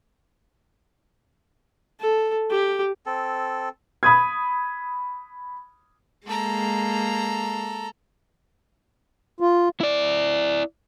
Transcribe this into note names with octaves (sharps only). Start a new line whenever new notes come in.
A4
G4
C4 A4
B5 D#6 G#6
G#3 A#3 A4 A#5
F4
E4 D5